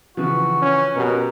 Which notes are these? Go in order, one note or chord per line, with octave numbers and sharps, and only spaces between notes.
C#3 E3 F3 F#4
C#4
B2 B3 G4 A#4 B4